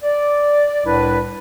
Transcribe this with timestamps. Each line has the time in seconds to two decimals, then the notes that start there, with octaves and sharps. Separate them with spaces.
0.02 D5
0.85 C2 A2 D4 E4 B4